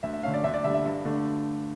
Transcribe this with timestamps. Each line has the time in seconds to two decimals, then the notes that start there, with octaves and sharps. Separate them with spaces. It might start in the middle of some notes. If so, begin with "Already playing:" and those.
0.03 D2 E5
0.13 E5
0.23 D3 A3 C#4 F5
0.34 D5
0.44 D2 E5
0.54 D5
0.64 D3 G3 D4 E5
0.74 E5
0.84 G2
1.05 D3 A3 D4